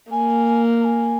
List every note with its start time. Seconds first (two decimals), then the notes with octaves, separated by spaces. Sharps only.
0.11 A#3 G#5
0.81 A#5
0.85 G#5